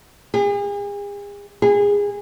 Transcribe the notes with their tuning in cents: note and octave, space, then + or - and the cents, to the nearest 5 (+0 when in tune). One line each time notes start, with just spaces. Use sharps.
G#4 -40
G#4 -25